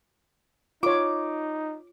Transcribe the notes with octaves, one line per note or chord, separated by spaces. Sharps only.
D#4 F4 C#5 D6